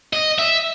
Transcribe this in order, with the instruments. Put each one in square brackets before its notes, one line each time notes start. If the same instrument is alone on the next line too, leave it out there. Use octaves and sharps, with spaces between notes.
[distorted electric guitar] D#5
E5